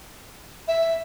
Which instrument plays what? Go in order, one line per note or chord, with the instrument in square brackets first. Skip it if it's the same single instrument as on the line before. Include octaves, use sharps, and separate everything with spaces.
[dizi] E5